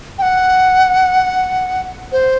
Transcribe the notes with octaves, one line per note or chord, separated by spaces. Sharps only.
G5
F#5
C5